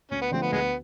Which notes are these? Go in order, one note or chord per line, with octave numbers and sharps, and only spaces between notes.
D2 C#4
B3
D3 F3 A3 C4
B3
D2 G#3 B3